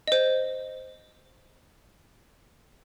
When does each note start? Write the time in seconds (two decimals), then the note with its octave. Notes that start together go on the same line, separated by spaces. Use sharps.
0.08 C5 D#5